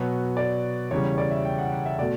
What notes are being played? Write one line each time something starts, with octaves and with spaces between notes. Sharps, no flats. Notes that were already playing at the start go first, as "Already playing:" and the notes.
Already playing: B2 F#3 B3 C#5
D5
E2 C#3 G3 C#5
D5
E5
G5
F#5
F#5
E5
B2 A3 D5